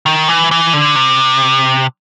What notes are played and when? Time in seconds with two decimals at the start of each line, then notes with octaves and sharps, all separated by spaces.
0.06 D#3
0.29 E3
0.51 E3
0.73 D3
0.95 C3